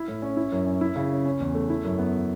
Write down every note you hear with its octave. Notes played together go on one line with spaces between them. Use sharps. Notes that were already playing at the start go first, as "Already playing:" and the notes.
Already playing: E4
A2
C#4
E4
F#2
C#4
E4
C#3
C#4
C#4
E2
A3
E4
F#2
B3